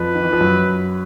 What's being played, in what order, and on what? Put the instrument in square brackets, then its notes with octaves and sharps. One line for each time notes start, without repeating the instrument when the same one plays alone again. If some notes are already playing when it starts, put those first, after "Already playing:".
Already playing: [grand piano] F2 F3 [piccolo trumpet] B4
[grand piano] D#3
E3
F3
F#2 F#3